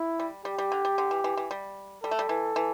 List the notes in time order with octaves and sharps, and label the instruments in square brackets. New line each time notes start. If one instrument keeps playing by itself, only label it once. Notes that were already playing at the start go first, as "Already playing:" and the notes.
Already playing: [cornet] E4
[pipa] G3
[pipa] G3 [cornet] G4
[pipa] G3
D3
G3
D3
E3
E3
E3
G3
[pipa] G3 [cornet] A4
[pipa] A3
G3
E3
E3